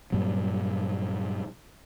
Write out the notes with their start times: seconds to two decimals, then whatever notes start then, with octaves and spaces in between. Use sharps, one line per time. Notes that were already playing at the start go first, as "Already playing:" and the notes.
0.12 G2 A#2 F#3